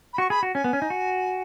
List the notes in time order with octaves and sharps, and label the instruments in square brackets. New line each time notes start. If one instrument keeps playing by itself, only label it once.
[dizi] B5
[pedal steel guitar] F#4 [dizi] C#6
[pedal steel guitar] G#4 [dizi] B5
[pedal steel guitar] F#4
[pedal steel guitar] C#4 [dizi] G#5
[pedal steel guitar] B3
C#4
D#4
F#4